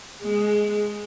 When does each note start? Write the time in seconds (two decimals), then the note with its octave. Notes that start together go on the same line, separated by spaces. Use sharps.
0.22 G#3